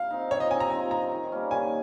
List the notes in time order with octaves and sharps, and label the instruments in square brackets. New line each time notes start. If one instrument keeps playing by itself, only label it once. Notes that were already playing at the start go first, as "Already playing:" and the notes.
Already playing: [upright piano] F5
[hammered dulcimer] C4 D#4
[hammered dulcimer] F3 [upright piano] C#5
[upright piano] D#5
[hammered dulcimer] C4 [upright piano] G#5
[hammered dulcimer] D#4
[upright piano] A#5
[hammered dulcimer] F3 [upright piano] G#5
[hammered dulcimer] C4 D#4 [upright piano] A#5
[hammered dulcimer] D#3
G3 A#3 C#4
[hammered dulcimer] D#3 [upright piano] G#5